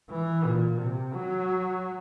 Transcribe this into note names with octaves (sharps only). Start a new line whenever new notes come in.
E3
A#2
C3
F#3